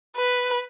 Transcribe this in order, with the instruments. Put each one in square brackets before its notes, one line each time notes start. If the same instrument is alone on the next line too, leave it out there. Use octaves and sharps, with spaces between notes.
[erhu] B4